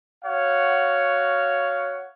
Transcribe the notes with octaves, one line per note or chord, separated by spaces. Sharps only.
F#4 C#5 F5 F#5